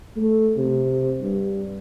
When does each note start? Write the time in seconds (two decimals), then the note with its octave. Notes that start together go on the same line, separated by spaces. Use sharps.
0.16 A3
0.56 C3
1.21 G2